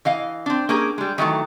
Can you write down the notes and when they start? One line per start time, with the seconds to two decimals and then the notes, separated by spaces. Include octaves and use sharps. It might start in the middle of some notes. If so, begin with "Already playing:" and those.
0.05 E3 D#5 F5
0.46 C4 D4
0.69 A#3 C#4 G4 G#4 A#4
0.98 G3 G#3
1.18 D#3 E3 F#3 A3